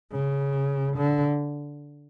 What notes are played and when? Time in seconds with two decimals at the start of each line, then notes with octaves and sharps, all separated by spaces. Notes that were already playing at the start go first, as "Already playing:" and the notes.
0.11 C#3
0.97 D3